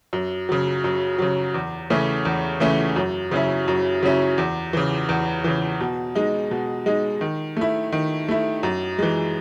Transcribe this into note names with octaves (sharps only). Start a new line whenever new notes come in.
F#2
C#3 F#3
F#2
C#3 F#3
E2
C#3 E3 A3 C#4
E2
C#3 E3 A3 C#4
F#2
C#3 F#3 C#4 E4
F#2
C#3 F#3 C#4 E4
E2
C#3 E3
E2
C#3 E3
B2
G#3 D#4
B2
G#3 D#4
D#3
A3 E4
D#3
A3 E4
F#2
E3 G#3